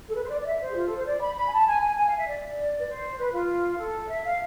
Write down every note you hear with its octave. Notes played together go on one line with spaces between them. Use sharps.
A4
B4
C5
D5
D5
E5
C5
G#4
F4
A4
C5
D5
B5
B5
G#5
A5
G#5
G#5
G#5
F5
E5
D5
B4
C5
B4
F4
A4
E5
F5